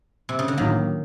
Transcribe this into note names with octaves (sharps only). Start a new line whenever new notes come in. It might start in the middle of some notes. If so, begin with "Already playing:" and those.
C3
C#3
D3
A2 D#3 F#3 A#3